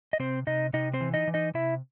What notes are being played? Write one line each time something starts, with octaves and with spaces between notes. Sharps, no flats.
D#5
C3 C4 C5
C3 D#4 D#5
C3 D#4 D#5
C4 C5
E3
D#4 D#5
E3
D#4 D#5
C3 E4 E5